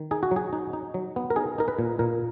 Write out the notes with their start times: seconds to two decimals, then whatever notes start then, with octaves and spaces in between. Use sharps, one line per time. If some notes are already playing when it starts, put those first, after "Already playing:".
Already playing: D#3
0.11 D#4 G#4
0.23 F#4
0.31 F#3
0.36 G#4
0.53 D#4
0.73 D#4
0.94 F#3
1.16 B3
1.30 A#4
1.36 D#4 G#4
1.58 D#4 A#4
1.68 B4
1.79 A#2
1.99 A#2 A#4